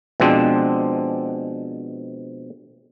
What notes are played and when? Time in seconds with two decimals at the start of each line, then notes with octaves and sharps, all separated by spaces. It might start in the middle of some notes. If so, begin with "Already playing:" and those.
0.20 B2 F3 G#3 C4 D4